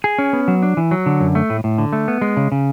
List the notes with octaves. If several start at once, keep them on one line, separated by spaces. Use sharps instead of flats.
G#4
C#4
B3
F#3
D4
E3
F#3
D3
F#2
A3
A2
A2
D3
A3
B3
G#3
C#3
C#3